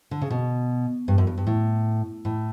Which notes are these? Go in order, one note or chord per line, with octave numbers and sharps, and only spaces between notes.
D3
C#3
B2
G2
F#2
G2
G2
A2
A2